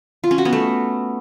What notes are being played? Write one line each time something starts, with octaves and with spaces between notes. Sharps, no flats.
F4
C#4
F#4
B3
A3